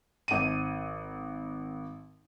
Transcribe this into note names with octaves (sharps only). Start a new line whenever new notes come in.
G#1 D#7